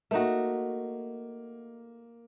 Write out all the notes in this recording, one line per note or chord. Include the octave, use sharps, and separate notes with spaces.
A3 A#3 D#4 F#4